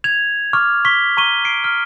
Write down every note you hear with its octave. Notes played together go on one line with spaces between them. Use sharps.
G#6 F7
C#6 D6 F6
C#6 B6 G7
A#5 C#6 D#7 G7
C7 D7
F6